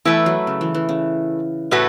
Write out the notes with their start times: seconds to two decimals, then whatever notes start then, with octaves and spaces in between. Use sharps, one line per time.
0.05 E3 A3 E4 B4
0.26 F#3
0.47 C#3
0.61 E3
0.74 E3
0.89 C#3
1.71 A2 A3 F#4 B4